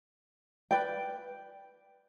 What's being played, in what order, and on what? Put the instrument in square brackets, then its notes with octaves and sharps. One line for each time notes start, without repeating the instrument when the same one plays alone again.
[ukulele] B4 D5 G5